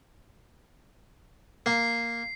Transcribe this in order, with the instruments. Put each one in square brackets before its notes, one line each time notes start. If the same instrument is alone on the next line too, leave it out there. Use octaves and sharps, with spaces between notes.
[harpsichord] A#3 [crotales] C7